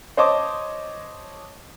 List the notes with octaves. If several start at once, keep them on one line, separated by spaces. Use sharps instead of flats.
C5 C#5 D#5 A5 D6